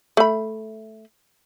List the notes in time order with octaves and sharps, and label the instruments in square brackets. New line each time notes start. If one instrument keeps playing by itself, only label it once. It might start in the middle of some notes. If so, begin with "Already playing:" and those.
[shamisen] A3 B5